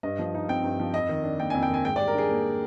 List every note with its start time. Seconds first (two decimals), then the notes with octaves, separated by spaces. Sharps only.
0.03 G2 D#5
0.19 F3
0.34 D#4
0.48 C4 G5
0.64 G2
0.80 F3
0.94 F2 D#5
1.09 D#3
1.24 D4
1.39 A#3 G5
1.50 G#5
1.54 F2
1.63 G5
1.69 D#3 G#5
1.85 G#2 G5
1.96 D5
2.00 G3
2.08 A#4
2.14 D4 G#4
2.30 A#3